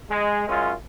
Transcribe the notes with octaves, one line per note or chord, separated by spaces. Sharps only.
G#3
F#2 G#3 C#4 F4